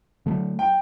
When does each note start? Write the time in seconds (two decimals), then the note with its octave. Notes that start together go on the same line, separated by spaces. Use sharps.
0.26 D3 F#3 A3
0.59 G5